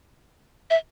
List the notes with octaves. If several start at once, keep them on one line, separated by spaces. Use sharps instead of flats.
E5